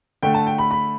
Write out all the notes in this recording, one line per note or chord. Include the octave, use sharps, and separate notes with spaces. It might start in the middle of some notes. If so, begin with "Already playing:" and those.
D3 A3 G5
A5
G5
B5
B5